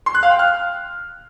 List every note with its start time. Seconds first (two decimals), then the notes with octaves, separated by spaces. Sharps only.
0.06 C6
0.15 F#6
0.23 F5
0.31 G5
0.39 F6